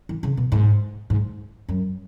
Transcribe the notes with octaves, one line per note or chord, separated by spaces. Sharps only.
E3
C#3
B2
G#2
G#2
F#2